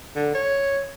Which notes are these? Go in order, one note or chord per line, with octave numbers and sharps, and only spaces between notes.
D3
C#5